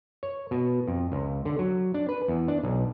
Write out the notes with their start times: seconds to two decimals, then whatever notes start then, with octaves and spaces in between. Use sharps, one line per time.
0.23 C#5
0.51 B2
0.87 F2
1.12 C#2
1.45 D3
1.59 F#3
1.94 D4
2.09 B4
2.28 E2
2.48 D4
2.63 B1